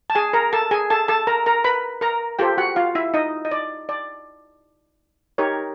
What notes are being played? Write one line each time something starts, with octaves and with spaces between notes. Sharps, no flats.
A5
G#4 G#5
A#4 A#5
A4 A5
G#4 G#5
A4 A5
A4 A5
A#4 A#5
A#4 A#5
B4 B5
A#4 A#5
F4 G4 A4 C5 G5
F#4 F#5
F4 F5
E4 E5
D#4 D#5
D#5
D5
D5
D#4 G4 A#4 C#5